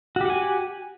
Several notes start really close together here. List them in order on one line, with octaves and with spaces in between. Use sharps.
F#4 G4 F#5 G#5